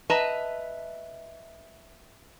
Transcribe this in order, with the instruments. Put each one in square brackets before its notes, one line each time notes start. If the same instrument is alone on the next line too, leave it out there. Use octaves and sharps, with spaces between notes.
[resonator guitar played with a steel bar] B4 D#5 E5 A5 A#5